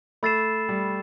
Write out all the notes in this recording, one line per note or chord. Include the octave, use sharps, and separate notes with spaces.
A3 B5 E6 A6 C7 E7
G3